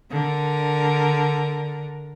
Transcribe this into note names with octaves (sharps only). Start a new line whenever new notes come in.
D3 A#4